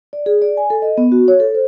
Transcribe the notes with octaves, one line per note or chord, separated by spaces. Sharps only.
D5
G#4
D5
G#5
A4
D#5
B3
F#4
C#5
A4
C5